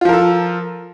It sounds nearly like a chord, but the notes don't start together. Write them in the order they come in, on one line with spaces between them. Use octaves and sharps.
F4 F3 A#4 A4